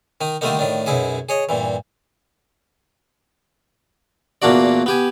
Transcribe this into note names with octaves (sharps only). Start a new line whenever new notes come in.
D#3 D#4
D3 D#3 G3 A3 A#3 D#4
A2 D#3 D4
B1 F#2 B2 E4 G#4 E5
G#4 C#5 D#5
G2 A#2 E3
E2 A#2 A#3 D4 F#4 D5
B3 G4 G#5